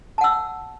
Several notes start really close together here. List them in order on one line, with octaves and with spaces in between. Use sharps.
A5 F#5 E6